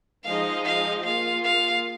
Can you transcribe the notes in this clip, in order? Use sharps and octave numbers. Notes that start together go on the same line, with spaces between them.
F3 G#3 D#4 G#4 D#5 F5
F5
A#3 F4 G#4 F5
F5